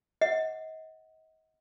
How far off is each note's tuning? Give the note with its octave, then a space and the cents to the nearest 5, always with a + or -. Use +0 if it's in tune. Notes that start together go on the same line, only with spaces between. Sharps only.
D#5 +35 F#5 +0